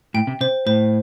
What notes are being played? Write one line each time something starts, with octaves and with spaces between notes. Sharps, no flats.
A2 G5
C3
C3 C5
A2 C5